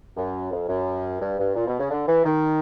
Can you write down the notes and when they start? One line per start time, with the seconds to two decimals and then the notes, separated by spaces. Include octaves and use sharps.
0.17 F#2
0.52 F2
0.69 F#2
1.22 G2
1.39 G2
1.56 A#2
1.67 B2
1.80 C#3
1.91 D3
2.08 E3
2.25 D#3